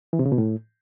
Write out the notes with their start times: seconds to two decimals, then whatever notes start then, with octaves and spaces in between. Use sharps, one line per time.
0.13 E3
0.19 C3
0.26 C#3
0.32 B2
0.38 A2